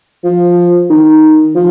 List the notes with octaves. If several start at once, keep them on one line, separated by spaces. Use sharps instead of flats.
F3
D#3
F3